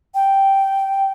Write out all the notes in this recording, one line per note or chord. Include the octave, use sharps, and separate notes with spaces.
G5